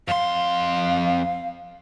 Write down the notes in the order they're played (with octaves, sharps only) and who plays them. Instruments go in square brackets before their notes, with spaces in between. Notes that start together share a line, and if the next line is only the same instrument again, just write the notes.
[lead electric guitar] F2 C6 [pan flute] F5